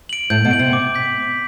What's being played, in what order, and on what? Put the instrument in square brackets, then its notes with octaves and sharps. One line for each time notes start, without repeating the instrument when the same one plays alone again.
[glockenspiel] D7 F#7
[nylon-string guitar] A2 [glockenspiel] G6
[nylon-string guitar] B2
[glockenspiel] D7 F#7
[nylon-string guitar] C3
[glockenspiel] D6
G6 B6